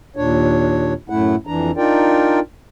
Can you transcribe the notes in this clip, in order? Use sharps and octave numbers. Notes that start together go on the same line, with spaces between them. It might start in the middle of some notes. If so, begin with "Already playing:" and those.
D#2 A#2 D4 C#5
F#2 A2 A3 E4 F#5
F2 E3 D4 A#5
D4 D#4 F4 A#4 D5 G5